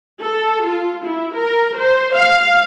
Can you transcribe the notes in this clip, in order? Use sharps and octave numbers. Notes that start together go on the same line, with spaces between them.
A4
F4
E4
A#4
C5
F5